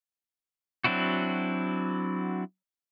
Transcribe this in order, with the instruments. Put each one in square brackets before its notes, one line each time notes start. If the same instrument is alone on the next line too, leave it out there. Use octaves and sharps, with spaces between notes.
[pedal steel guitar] F#3 C4 D4 E4 F#4